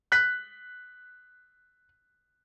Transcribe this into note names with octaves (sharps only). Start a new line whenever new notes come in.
F#6 B6